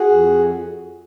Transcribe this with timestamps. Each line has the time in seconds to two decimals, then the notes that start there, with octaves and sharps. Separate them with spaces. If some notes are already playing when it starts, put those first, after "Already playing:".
Already playing: F#4 G#4
0.10 F2